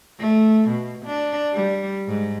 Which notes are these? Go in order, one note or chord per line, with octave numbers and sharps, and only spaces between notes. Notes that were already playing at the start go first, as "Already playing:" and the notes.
A3
B2
D4
G3
G#2